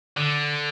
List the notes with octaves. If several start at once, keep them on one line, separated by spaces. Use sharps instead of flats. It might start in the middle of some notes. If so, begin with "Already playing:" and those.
D3